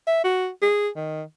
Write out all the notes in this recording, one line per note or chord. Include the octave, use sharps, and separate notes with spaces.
E5
F#4
G#4
D#3